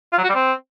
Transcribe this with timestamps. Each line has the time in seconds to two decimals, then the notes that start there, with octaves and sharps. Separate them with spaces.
0.13 F4
0.18 F#3
0.24 F#4
0.29 G3
0.35 C4